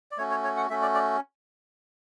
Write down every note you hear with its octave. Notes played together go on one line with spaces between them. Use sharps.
D5
A3 C#4 F#4 C#5
C#5
C#5
F#5
A3 C#4 F#4 E5
D5
D5